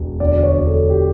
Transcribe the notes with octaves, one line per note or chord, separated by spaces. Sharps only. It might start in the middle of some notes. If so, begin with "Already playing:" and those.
Already playing: E1
D2 D5
C#5
D2
A4
G4